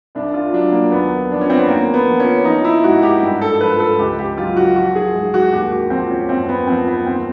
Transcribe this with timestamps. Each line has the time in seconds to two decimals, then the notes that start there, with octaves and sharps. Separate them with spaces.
0.15 C2 D4
0.34 F4
0.53 F#3 D4
0.72 A#3
0.92 D#2 B3
1.30 F3 D4
1.41 C#4
1.50 C4
1.59 B3
1.68 D#2 A#3
1.94 B3
2.07 F3
2.20 C#4
2.45 F3 D#4
2.64 E4
2.84 G#2 F#4
3.03 G4
3.22 G2
3.41 A4
3.61 F3 B4
3.80 A4
3.98 C#2 G4
4.19 G4
4.37 F#3 F4
4.57 F#4
4.76 F3 F#4
4.95 G#4
5.15 G#2
5.34 F#4
5.53 D#2 G4
5.72 F#4
5.90 F3 C4
6.10 C#4
6.29 F#2 C4
6.49 B3
6.67 F3 C4
6.87 B3
7.05 D#2 C4